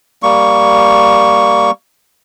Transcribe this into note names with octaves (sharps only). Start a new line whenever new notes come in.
G3 A#3 C#6